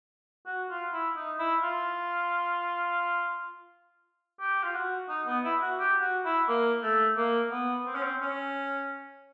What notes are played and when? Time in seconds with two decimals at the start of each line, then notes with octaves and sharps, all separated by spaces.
0.46 F#4
0.70 F4
0.93 E4
1.16 D#4
1.39 E4
1.63 F4
4.40 G4
4.63 F4
4.75 F#4
5.09 D#4
5.27 B3
5.44 E4
5.61 F#4
5.78 G4
6.01 F#4
6.25 E4
6.48 A#3
6.83 A3
7.17 A#3
7.51 B3
7.86 C4
7.95 C#4
8.03 C4
8.21 C#4